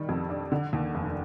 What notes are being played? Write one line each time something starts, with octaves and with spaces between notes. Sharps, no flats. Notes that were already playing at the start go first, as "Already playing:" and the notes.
Already playing: D#3 G3
F2
D4
D3
D#2
F1